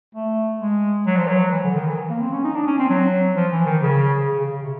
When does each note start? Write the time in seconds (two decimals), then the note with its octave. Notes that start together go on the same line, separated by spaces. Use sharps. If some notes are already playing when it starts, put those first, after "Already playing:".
0.15 A3
0.61 G#3
1.07 F#3
1.17 F3
1.28 F#3
1.52 E3
1.64 D3
1.76 D#3
1.87 E3
2.10 A#3
2.21 C4
2.33 C#4
2.44 D#4
2.55 D4
2.67 C#4
2.79 C4
2.90 F#3
3.36 F3
3.52 E3
3.66 D#3
3.82 C#3
4.28 C#3
4.39 C#3
4.50 C#3
4.62 C3